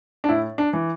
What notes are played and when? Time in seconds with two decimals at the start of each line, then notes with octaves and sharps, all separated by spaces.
0.24 D4
0.29 A2 E4
0.58 D4
0.73 E3